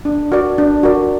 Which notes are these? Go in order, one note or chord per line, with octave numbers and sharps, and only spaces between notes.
D4
F#4 A#4 D5
D4
F#4 A#4 D5